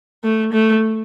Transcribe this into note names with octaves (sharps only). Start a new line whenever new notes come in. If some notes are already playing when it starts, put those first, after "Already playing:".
A3
A3